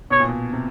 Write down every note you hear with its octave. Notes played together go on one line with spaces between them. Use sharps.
B2 C#5
A#2
B2
C3